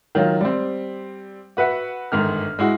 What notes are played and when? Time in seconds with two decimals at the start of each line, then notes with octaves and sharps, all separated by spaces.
0.15 D#3 F#3 F4
0.41 G3 C4
1.57 F#4 B4 E5 F#5
2.12 G1 G#2 D#3 F6
2.59 G#3 E4 F#4